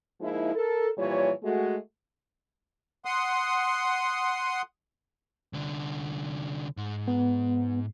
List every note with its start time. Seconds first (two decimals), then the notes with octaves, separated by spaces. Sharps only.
0.21 F3 G#3 A#3 D#4 E4
0.55 A4 A#4
0.97 A#2 E3 F3 G3 C#5
1.43 G#3 A3 F#4
3.05 F#5 C6 D#6
5.53 C2 D3
6.77 G#2
7.08 B3